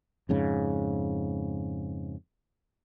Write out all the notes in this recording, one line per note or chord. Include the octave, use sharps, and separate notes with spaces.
F2 G#2 C#3